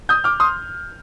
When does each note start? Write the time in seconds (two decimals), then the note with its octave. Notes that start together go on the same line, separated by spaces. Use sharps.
0.09 D#6 G6
0.24 D6 F6
0.40 C6 D#6